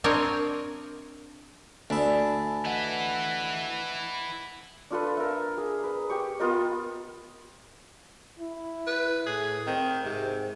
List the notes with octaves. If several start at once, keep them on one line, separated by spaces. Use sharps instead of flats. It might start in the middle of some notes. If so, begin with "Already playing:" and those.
C4 D4 A#4 C#5 D#5
D2 D4 E5 G#5 B5 D#6
E4 B4 D#5 F#5
D4 F4 A4 B4
A#4 E5
G#4
B4
G4 C#6
B3 F4 A#4 D#5
E4
B4
A2 G#4
D#3 C4
G#2 C3